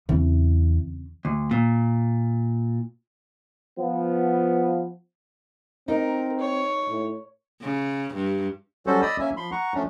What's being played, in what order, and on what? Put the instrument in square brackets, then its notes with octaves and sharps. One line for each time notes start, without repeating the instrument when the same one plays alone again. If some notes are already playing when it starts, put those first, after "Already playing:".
[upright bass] E2 [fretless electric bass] C#3 C4
[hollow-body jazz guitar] D2
A#2
[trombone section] F3 B3
[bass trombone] C4 [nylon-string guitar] D#4 [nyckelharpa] A#4
[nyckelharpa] C#5
[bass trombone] A2
[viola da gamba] C#3
G2
[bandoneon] F#3 G3 C#4 F#4 A4 C5
D5 D#5 B5 D#6 E6
A#3 C#4 E5 G#5
F3 B5 C6
F#5 A#5 C#6
F3 A3 C#4 D4